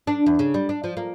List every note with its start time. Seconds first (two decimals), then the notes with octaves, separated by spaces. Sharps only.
0.07 D4
0.26 E2
0.39 C#3
0.54 G3
0.69 D4
0.84 F3
0.97 A#3